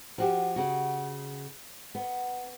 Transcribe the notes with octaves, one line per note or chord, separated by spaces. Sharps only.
F3 F#4 G4
C#3 F#4
B3